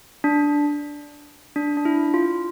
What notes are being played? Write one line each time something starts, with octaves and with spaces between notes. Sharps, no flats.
D4
D4
D4
E4
F4